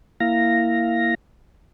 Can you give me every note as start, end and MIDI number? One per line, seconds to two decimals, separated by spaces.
0.20 1.15 58
0.20 1.15 64
0.20 1.15 77
0.20 1.15 94